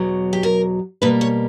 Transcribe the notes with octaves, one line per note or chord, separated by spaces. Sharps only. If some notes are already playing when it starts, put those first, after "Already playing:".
Already playing: E2 B2 F#3
G4
A#4
B2 G3 A#3 B4
C#5